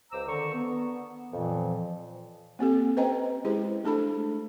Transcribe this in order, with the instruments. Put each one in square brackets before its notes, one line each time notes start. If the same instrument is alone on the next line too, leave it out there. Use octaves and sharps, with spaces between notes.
[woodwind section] C#2 C5 A#5 D6 E6
D3 D#3 A#5 C#6
B3
F2 A#2 E3 F3
[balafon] A#3 C4 G4 A4
C#4 B4 C5 D#5 G5 A#5
G#3 E4 G4 G#4 C5
A3 D4 A4 B5